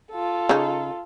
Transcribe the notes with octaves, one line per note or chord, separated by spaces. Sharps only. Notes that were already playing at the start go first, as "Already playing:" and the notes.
F4 A4
C#3 D#4